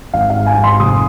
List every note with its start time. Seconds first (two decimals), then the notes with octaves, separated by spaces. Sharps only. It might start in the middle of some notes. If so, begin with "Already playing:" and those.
0.13 G#1 F5
0.30 F5
0.35 G#2
0.46 G#5
0.58 G#1
0.64 C6
0.80 F1 D#6